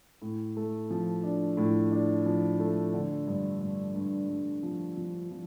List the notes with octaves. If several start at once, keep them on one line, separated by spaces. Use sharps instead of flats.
A2
A3
F3
D4
A2
D4
F3
A3
D3
G2
G2
G2
G2
F3
F3
F3